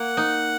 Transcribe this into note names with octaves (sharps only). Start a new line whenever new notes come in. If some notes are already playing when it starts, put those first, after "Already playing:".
Already playing: A#3 F#5
D#4